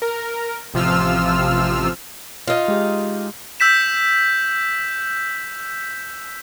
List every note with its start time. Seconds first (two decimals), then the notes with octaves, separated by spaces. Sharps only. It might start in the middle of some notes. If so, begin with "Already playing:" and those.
0.02 A#4
0.74 A1 C3 F3 F4 E6 F6
2.48 D#4 F4
2.68 G#3 G4
3.60 E6 G6 B6 E7